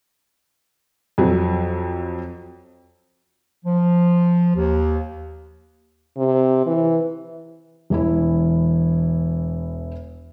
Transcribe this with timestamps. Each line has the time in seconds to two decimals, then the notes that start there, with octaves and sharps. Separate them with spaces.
1.18 F2 F#3
3.65 F3
4.55 D#2
6.17 C3
6.67 E3
7.90 E1 E3 E4